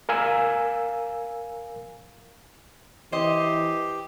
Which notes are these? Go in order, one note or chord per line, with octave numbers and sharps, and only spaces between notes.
A#4 F5 G#5 E6
E3 G4 C5 D#5